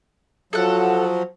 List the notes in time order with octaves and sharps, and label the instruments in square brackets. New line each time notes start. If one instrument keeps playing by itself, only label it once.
[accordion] F3 F#3 [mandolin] A4 F#5